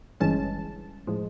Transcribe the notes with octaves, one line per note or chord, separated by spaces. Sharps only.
G1 G2 E3 G#3 C#4 A5
A2 F3 G#3